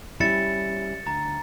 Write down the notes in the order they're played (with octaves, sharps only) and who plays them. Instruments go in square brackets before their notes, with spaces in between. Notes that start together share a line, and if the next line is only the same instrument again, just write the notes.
[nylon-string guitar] G3 C#4 E4 [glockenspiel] A6 C#7 E7
[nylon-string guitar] D2 [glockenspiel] A#5 A6